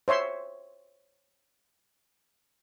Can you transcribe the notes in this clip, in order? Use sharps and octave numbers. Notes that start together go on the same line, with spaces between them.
C5 C#5 E5 C6